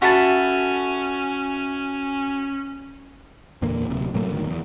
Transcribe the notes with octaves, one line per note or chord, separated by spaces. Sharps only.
C#4 F#4 A4 E5 B5
E2 A#2 D3 A#3
D1 C3
A2 F#3 A3 A#3
G1 D2 D#3
E2